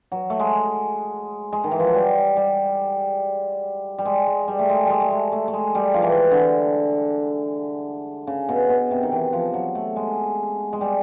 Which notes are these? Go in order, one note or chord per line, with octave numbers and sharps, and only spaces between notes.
F#3
A3
G#3
G#3
D#3
E3
F3
F#3
G3
G3
G3
G#3
G#3
G3
A3
G#3
G3 G#3
A3
G#3
A3
A3
G#3
G3
F3
E3
D3
C#3
B2
B2
C3
D#3
E3
F3
F#3
A3
G#3
G#3
G3